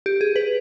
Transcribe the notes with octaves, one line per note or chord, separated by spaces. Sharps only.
G4
G#4
B4